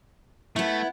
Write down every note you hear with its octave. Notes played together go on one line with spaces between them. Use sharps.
A3 B3 E4